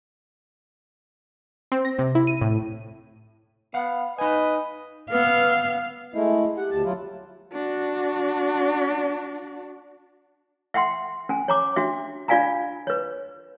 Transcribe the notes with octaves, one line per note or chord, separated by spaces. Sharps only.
C4
A#6
C3
E4
D#7
A2
B3 F5 F#5
D#4 B4 D#5 G#5
B3 B4 F5 E6 F6
G#3 A3 E4 D#5
G4 F#5
D2 A5
F#3 E4 F4
D4 F#4
E5 F#5 G5 C6
C#4 G#5
C#5 A#5 D6
D4 F#4 E5
D4 F4 D5 F5 G#5 A#5
B4 C#5